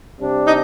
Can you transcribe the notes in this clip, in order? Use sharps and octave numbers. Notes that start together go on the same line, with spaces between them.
C3 G3 D4
D#4